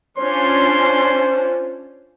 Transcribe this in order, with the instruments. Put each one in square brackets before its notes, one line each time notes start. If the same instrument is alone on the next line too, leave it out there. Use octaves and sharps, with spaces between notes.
[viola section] C#4 D4 F4 [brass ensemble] C5 [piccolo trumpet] C6